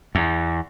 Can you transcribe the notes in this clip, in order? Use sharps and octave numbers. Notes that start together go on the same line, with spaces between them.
E2